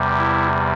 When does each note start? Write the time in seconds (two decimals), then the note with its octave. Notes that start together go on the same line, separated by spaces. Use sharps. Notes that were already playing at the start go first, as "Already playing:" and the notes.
Already playing: E2 C3 G3
0.18 E4